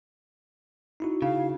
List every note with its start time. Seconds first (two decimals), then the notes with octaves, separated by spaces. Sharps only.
1.00 D#4 E4 F#4
1.22 C#3 F5